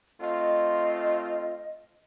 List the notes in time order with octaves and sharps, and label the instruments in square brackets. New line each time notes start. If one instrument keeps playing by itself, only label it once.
[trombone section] A3 C4 F4 [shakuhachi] D#5